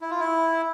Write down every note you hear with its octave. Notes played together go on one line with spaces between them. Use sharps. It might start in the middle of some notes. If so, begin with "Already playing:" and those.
E4
F4
E4